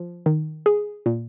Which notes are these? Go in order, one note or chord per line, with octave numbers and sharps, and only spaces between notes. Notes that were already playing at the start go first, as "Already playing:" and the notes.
Already playing: F3
D#3
G#4
A#2